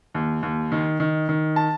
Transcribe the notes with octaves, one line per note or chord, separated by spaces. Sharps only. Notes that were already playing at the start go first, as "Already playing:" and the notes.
D#2
D#2
D#3
D#3
D#3
A5